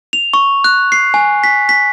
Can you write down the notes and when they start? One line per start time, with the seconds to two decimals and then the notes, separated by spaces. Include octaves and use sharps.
0.13 F7
0.34 C#6
0.64 F#6
0.92 C7
1.14 G#5
1.44 B6
1.69 B6